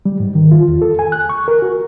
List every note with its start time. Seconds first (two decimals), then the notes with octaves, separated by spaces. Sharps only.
0.06 G3
0.20 G#2
0.35 D#3
0.51 F4
0.68 E2
0.82 A4
0.99 G#5
1.12 F#6
1.29 C#6
1.48 A#4
1.62 F#4